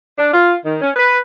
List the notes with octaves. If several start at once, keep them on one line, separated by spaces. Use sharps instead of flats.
D4
F4
D#3
C#4
B4